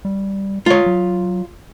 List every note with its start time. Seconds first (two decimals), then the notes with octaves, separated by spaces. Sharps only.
0.05 G3
0.66 G#3 F4 C#5
0.86 F#3